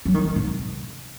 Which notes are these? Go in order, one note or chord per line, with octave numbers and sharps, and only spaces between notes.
F#3
D#3
D3
C3